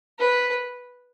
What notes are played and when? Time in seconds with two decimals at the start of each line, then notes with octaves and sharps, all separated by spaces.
0.19 B4